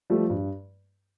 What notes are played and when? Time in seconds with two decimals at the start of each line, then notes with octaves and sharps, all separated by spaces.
0.10 F3 G3 A3
0.30 G2